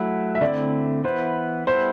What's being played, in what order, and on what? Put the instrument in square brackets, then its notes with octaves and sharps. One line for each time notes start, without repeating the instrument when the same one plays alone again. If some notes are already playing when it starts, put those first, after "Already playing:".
Already playing: [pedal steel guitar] F#3 A3 E4 [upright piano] F#5
[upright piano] E5
[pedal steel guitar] D3 A3 C4 E4 [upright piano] D5
[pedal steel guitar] E3 B3 E4 B4 [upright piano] C5
[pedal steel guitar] G3 B3 E4 A4 [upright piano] C5